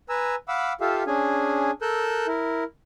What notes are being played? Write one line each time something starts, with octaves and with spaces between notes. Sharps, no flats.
B4 G#5 A#5 E6
F5 F#5 B5 D6 E6
F4 G4 A4 E5 F5
C#4 D4 G#4 G#5
A4 A#4 E6 F#6 G6
E4 A#4